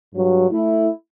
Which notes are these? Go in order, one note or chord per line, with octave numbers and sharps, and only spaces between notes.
G2 F#3
A3 E4